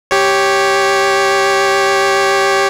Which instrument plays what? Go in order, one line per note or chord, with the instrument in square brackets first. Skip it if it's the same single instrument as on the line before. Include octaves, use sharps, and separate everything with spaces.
[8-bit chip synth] G4 C#5